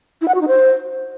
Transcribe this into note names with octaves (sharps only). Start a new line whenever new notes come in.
E4
F#5
F#4
D#4
C5